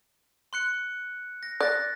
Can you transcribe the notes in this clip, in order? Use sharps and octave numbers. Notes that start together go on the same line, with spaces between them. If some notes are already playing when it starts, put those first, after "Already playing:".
C6 F#6 C#7
A#6
D5 F#6 A6 A#6